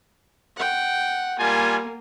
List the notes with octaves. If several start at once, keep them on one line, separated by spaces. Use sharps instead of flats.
F#5 G5
G3 A#3 F4 G#5